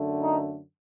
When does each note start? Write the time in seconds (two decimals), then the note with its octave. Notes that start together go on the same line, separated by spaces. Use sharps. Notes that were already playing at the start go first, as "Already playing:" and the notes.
Already playing: F#2 D3 A3
0.21 D#4